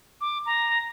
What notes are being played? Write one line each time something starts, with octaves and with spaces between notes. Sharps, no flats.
D6
A#5